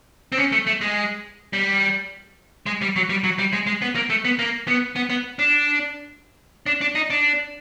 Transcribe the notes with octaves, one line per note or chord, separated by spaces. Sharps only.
C4
C#4
A3
A3
G#3
G3
G#3
G3
F#3
G3
F#3
G3
G#3
G#3
B3
A#3
A3
B3
A#3
B3
B3
B3
D4
D4
D4
D#4
D4